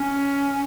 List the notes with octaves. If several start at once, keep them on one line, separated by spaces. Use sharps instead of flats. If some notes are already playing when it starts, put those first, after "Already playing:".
Already playing: C#4